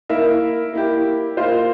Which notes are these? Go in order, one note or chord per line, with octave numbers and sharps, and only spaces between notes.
A#3 E4 A#4 E5
A#3 E4 G4
A#3 F4 C5